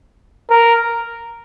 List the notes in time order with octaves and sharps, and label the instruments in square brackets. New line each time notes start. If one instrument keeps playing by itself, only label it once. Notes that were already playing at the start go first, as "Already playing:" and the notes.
[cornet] A#4